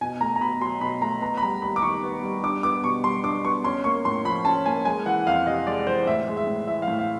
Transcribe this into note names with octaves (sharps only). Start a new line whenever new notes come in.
B2 G#5
A3 A#5
A#5
B2 B5
F#3 C6
B2 B5
A3 A#5
B3 A#5
B5
G3 A#5
D#2 B5
D6
D#3 C#6
B3
G3
D4 D6
B3 D6
B2 C#6
G3 C6
D4 D6
B3 C#6
C#4 C6
A#3 C#6
A2 C6
F3 B5
C#4 A5
A#3 G#5
G#3 G#5
E3 F#5
F2 F5
C3 D#5
G#3 D5
E3 C5
A2 E5
G#3
E5
A2
E3 E5
F5
A2
F5